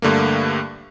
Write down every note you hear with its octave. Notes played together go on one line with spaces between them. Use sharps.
G2 D3 A3 A#3